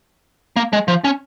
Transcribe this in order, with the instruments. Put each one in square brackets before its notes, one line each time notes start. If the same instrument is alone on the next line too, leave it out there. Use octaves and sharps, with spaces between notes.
[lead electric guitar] A#3
G#3
F3
C#4